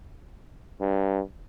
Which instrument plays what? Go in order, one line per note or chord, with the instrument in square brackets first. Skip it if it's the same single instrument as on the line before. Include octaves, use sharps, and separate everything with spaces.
[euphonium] G2